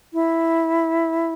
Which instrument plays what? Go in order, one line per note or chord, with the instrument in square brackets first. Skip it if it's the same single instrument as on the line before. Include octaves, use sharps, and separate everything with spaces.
[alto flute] E4